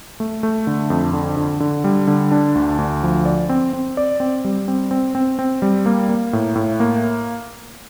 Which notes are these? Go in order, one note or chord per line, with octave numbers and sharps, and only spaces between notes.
A3
A3
D3
F2
D3
D3
D3
G3
D3
D4
D2
D2
F3
D5
C4
C4
D5
C4
G3
C4
C4
C4
C4
G3
A#3
A#3
A2
A2
A#3